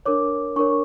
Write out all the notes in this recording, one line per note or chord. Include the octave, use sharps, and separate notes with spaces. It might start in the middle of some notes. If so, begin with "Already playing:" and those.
D4 A#4 C#5 D6
D4 A#4 C#5 C#6